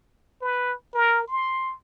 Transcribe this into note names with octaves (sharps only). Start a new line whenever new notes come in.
B4
A#4
C6